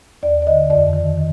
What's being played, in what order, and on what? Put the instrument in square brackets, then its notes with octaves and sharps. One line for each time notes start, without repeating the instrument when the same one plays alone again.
[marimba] D#2 D5
D5
D3 D#5
F2 D5
D#3
D#3